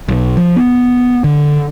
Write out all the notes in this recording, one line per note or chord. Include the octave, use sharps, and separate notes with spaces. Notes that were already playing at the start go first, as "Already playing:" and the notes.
B1
F3
B3
D3